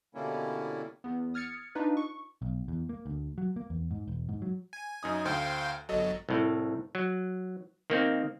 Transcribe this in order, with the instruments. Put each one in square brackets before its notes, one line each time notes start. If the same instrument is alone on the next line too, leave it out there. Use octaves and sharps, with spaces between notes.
[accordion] B2 D3 G3 A#3 C#4 E4
[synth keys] E2 B3
D#6 F6 G#6 A6 C#7
D4 D#4 F4 B4
C#6
[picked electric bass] B1
E2
A#3
D2
F#3
A#3
E2
G#2
E1
G#2
F#3
[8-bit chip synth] G#5
[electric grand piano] F#2 D#4 D#6
[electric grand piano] D2 [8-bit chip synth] C5 F5 G5
[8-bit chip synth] G1 F#3 [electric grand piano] A4 D#5
[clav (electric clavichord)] C2 A2
F#3
D#3 A#3 C4